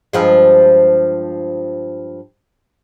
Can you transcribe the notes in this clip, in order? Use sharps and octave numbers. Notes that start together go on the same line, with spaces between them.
G2 F3 G#3